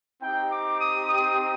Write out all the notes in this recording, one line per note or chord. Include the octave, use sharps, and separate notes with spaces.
C4 D#4 G4 G5
D6
D#6
D#6